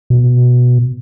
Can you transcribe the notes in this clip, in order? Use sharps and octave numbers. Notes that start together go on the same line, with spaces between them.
B2